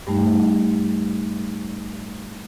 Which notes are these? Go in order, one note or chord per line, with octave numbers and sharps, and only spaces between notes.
G2 G3 A3 D#4